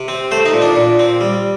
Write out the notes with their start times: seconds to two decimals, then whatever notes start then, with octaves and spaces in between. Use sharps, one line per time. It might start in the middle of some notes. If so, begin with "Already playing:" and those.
Already playing: C3
0.08 C4
0.31 A3 C5
0.45 D#4
0.54 A#2
0.62 D4
0.76 A#2
0.99 C4
1.21 G3